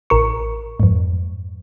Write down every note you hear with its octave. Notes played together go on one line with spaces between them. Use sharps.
A1 A#4 C#6
F2 G#2